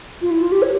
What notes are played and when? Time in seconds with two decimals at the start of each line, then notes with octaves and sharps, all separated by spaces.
0.21 F4
0.30 E4
0.42 F4
0.51 G4
0.62 C#5